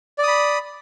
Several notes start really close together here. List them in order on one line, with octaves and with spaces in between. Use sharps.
D5 D#6 B5